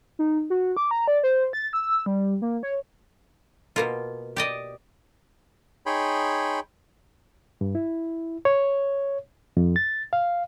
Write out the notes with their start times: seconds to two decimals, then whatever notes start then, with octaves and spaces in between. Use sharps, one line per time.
0.19 D#4
0.50 F#4
0.77 D6
0.91 A#5
1.08 D5
1.23 C5
1.53 A6
1.73 E6
2.06 G3
2.42 A#3
2.63 C#5
3.76 B2 A#3 F4
4.36 G4 D5 D#5
5.86 D#4 G#4 C#5 G5 B5 C6
7.61 G2
7.75 E4
8.45 C#5
9.57 F2
9.76 A6
10.13 F5